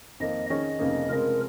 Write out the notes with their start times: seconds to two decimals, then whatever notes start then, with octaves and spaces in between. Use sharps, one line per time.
0.20 F2 D#3 A#3 D#5
0.50 D#3 C#4 G#4 C#5 D#5
0.79 F1 F2 C#3 A#3 D#4
1.09 F1 F2 C#3 G#3 F4 A#4